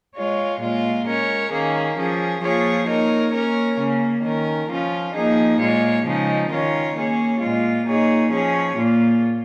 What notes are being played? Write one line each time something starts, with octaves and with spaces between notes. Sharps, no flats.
G#3 F4 C#5
A#2 G#3 F4
G#3 C#4 A#4 C#5
D#3 A#3 C#4 G#4
F3 C#4 G#4
F3 A#3 F4 G#4 C#5
A#3 D#4 A#4 C#5
A#3 C#4 A#4 C#5
C#3 A#3 C#4
D#3 C#4 A#4
F3 C#4 F4
F3 A#3 D#4 G#4
A#2 G#3 F4 C#5
C#3 F3 G#3 D#4
D#3 C#4 F4 A#4 C#5
A#3 C#4 G#4 C#5
A#2 G#3 F4
A#3 D#4 G#4 C#5
F3 C#4 G#4 C#5
A#2 A#3 F4